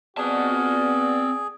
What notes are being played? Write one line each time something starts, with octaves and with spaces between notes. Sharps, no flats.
B3 C4 F#4 G#4 D5 A5